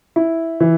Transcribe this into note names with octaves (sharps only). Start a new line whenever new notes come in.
E4
E3